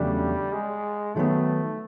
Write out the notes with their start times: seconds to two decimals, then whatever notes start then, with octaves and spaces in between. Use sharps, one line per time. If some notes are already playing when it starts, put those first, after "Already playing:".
Already playing: E2 C#3 F#3 G3 A3 D4
0.52 G#3
1.16 D#3 F#3 A3 B3